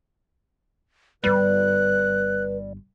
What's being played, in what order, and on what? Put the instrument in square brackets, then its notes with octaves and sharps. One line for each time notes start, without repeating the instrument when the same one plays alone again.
[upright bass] G1 G2 [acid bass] G3 [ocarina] B4 [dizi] F#6